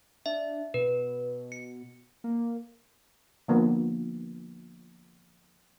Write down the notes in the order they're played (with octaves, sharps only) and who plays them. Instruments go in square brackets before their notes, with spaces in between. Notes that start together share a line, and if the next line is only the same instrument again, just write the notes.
[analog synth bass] D4 [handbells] E5
[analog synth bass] B2 [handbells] B4
[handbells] C#7
[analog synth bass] A#3
[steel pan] D3 F3 A#3 B3